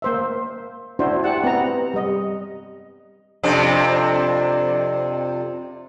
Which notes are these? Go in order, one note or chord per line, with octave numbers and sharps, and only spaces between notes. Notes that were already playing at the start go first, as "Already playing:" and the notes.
A#3 C5 E5
D4 E4 F#4 C5
G4 F#5 A5
B3 C4 F#5 A#5
G3 D#5
F2 C3 D4